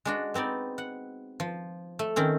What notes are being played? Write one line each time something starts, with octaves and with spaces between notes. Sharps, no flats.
G#3 D4 F#4
B3 C4 D#4 D5
F#5
F3
A3
D#3 C4 C#4